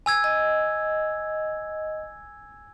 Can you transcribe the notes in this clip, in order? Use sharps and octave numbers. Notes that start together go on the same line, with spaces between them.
G#5 E6 G#6
D#5